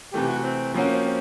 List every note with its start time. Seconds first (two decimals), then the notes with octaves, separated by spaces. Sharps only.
0.13 C3 E3 A3 G4
0.28 F#4
0.43 C4
0.74 F3 A#3 C4 C#4 F#4
0.89 C4
1.04 C4